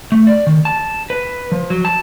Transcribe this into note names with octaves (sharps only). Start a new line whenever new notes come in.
A3
D5
D#3
A5
B4
F3
F#3
A5